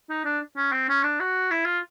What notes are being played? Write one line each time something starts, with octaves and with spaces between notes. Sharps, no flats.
D#4
D4
C#4
C4
C#4
D4
F#4
E4
F4